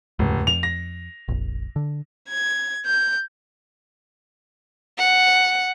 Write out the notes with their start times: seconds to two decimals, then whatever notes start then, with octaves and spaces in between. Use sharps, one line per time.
0.19 F1 D#2 G#2 C#3
0.47 F2 F7
0.63 A#6
1.28 F1 A#1
1.76 D3
2.29 G#6
2.87 G6
4.98 F#5